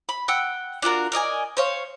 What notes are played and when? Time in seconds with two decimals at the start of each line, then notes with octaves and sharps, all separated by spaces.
0.09 B5
0.28 F#5 G5 E6 F#6
0.82 D4 F4 F#4 A#4
1.12 A#4 D5 D#5 G#5
1.57 C5 C#5 F5